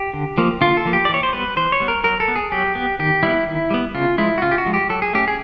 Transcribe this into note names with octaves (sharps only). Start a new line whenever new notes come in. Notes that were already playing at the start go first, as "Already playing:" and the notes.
Already playing: G4
D3
F3 A#3
D3 F4
A4
F3 A#3
G4
D5
E3 C#5
C5
G3 B3 B4
E3 C5
C#5
G3 B3
A#4
F#3 A#4
A4
B3
G#4
F#3 G4
B3
D#3 G4
G3 B3 E4
D#3
G3 B3
C#3 F4
F3 G#3 E4
F#4
C#3 F4
G4
F#4
F3 G#3
G4
F#3 A4
G#4
A3 C#4 G4
G#4